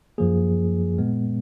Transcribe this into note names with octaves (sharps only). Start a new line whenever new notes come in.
F#2 F3 A#3 G#4
A#2 G#3 B3